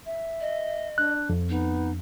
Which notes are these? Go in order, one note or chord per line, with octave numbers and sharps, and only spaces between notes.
E5
D#5
D4 F#6
F2
B3 D#4